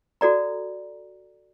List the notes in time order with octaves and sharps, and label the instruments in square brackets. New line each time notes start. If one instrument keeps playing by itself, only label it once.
[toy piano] F#4 A4 D5 A#5